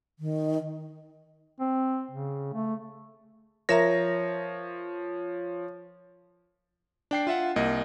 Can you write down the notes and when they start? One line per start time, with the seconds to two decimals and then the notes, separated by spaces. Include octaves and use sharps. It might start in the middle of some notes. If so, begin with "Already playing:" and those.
0.19 D#3
1.60 C4
2.11 C#3
2.54 A3
3.69 F3 A#4 C#5 E5 A#5 A#6
7.11 D4 G5 C7
7.27 F4 E5 F#5
7.56 C2 A#3 D#5